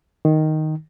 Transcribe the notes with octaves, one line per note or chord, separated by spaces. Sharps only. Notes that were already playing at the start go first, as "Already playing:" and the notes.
D#3